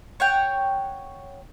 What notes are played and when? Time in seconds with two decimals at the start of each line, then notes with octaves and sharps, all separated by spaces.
0.20 C#5 F#5 G5